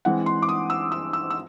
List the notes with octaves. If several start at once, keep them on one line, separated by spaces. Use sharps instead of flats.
E3 G#3 C4 F#5
C6
D6
D#6
E6
E6
E6
E6